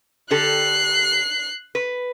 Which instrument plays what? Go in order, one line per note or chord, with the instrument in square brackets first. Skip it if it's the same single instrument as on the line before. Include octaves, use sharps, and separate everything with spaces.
[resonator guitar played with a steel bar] D3 G4 A4 [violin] F#6 C7
[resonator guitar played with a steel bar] B4